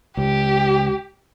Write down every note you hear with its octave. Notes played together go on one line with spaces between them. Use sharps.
C#2 G4